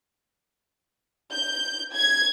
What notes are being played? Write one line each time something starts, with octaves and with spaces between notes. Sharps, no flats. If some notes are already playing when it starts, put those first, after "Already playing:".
G6
G#6